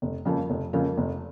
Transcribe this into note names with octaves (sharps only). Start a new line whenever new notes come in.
F1
F2 C#3 F3 A#3
F1
F2 C#3 F3 A#3
F1